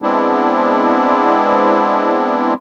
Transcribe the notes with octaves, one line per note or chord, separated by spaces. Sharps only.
G#3 B3 C4 D4 E4